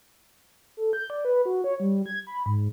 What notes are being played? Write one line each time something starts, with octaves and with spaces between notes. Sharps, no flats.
A4
G6
D5
B4
F#4
C#5
G3
G#6
B5
G#2